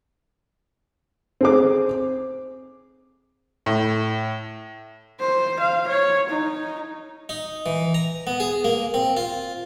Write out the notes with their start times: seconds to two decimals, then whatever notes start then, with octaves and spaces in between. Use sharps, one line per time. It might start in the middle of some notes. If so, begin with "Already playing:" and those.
1.41 C4 G#4 D6
3.66 A2
5.20 C5
5.60 F5
5.88 C#5
6.29 D#4
7.29 D#4
7.66 E3
7.94 A#5
8.27 B3
8.40 G#4
8.65 A#3
8.94 C4
9.17 F4